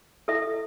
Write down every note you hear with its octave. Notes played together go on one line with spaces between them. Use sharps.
E4 A4 E5